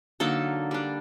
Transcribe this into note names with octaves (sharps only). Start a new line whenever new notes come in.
D3 F#3 A#3 D#4 A4
G3 D4